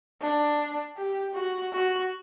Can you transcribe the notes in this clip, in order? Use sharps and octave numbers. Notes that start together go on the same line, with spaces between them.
D4
G4
F#4
F#4